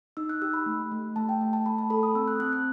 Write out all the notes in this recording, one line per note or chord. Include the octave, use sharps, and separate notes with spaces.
D#4 E6
F#6
G4 E6
B5
A3
A3
A3 A5
G5
A3
A5
A3 B5
A5
A4 B5
D#6
C4 E6
F#6
C4 F#6
F#6